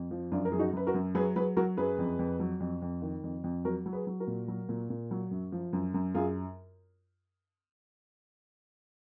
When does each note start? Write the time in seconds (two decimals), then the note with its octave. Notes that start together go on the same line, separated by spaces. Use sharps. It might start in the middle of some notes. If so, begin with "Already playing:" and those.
Already playing: F2
0.11 F3
0.32 F#2 D4 F4
0.45 A#4
0.52 F#2 G#4
0.59 D#4 F#4
0.73 F#2 B4
0.87 F#4 A#4
0.94 F#2
1.15 F#3 G#4 B4
1.36 F#3 G#4 B4
1.57 F#3 F#4 A#4
1.77 F#2 G#4 B4
1.98 F2
2.19 F2
2.40 F#3
2.60 F2
2.82 F2
3.02 D#3
3.24 F2
3.44 F2
3.65 F#3 F#4 A#4
3.86 F#3
3.93 G#4 B4
4.07 F#3
4.20 F#4 A#4
4.27 A#2
4.48 F#3
4.69 A#2
4.90 A#2
5.11 F#3
5.31 F#2
5.52 F3
5.73 F#2
5.94 F#2
6.14 F#2 F4 G#4